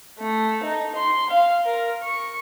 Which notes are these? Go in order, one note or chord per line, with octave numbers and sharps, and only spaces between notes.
A3
D#4
C6
F5
A#4
C#6